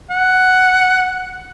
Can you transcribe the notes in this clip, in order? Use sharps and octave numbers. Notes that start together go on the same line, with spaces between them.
F#5